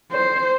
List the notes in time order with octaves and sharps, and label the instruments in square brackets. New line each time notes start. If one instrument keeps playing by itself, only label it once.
[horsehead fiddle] C5